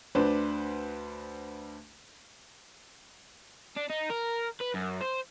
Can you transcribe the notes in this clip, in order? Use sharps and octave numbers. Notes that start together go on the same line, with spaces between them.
D2 D4 B4 C5
D4
D#4
A#4
B4
F#2
C5